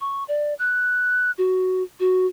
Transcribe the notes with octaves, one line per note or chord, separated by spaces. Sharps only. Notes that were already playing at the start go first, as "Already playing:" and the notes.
C#6
D5
F#6
F#4
F#4